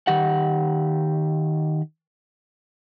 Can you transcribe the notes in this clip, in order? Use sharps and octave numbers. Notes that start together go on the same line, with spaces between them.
D#3 G4 F#5